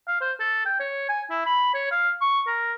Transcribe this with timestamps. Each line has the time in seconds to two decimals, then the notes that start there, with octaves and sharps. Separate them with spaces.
0.08 F5
0.21 C5
0.40 A4
0.66 G5
0.80 C#5
1.09 G#5
1.30 E4
1.46 B5
1.74 C#5
1.91 F5
2.21 C#6
2.47 A#4